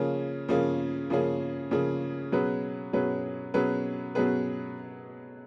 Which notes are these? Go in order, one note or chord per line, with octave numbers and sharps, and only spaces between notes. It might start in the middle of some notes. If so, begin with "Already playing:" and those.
Already playing: C#3 F3 A#3 C#4 G#4
C#3 F3 A#3 C#4 G#4
C#3 F3 A#3 C#4 G#4
C#3 F3 A#3 C#4 G#4
B2 F#3 C#4 G#4 B4
B2 F#3 C#4 G#4 B4
B2 F#3 C#4 G#4 B4
B2 F#3 C#4 G#4 B4